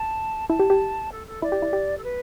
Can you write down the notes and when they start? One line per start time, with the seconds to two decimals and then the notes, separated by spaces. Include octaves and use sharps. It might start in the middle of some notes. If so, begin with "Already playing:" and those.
Already playing: A5
0.49 E4 A5
0.59 G4
0.70 G4
1.12 A4
1.27 A4
1.42 E4 D5
1.52 G4
1.62 E4
1.73 G4
1.97 A4
2.04 B4